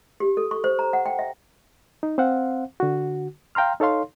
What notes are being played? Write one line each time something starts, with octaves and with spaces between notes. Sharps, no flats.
G4
A4
C#6
C5
A#5
F#5
G5
E5
D#4
C4 C5 F5 F#5
D3 F#4
F5 G5 A#5 C6 F6
D#4 A4 C#5 F5 C6